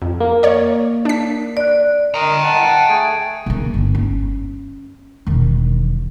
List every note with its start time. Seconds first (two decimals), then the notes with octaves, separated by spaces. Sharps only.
0.02 F2
0.20 A#3
0.43 C#5 D5
1.05 D4 B6
1.57 D5 F#6
2.14 A#4 D#5 G5 A#5
2.44 F#5 A5
2.89 A3 G#4
3.46 C#3 A#3
3.74 G1
3.95 C#4
5.27 E1 D#3